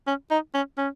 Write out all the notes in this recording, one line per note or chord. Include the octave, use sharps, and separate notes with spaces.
C#4
D#4
C#4
C#4